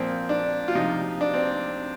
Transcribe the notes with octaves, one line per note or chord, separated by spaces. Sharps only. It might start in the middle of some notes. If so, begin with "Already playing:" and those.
Already playing: A#2 F3 C4
D4
F4
C3 F3 D#4
D4
C4